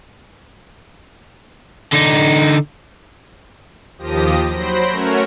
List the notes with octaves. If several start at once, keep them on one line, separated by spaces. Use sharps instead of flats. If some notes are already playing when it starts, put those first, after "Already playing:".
D3 D#4
D#2 F3 G4 D#6 A#6
F#3 C5 B5 A#6 D7
A3 C#4 F#4 A#4 C#5